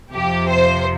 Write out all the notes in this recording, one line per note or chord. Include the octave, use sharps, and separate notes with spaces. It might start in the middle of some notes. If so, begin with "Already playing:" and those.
F2 C3 F3 G4
C5